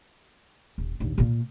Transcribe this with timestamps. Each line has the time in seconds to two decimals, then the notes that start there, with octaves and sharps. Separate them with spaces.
0.78 D#1
1.00 A#1 D#2
1.18 A#2 A#3